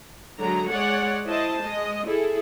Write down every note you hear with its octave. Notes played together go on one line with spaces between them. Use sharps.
D3 F#3 G#3 A#5
G#3 C#5 D5 F#5
E4 C5 D#5 A5
G#3 D#5
E4 G#4 A4